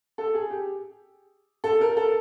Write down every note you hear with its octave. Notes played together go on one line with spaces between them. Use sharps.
A4
G#4
G4
A4
A#4
A4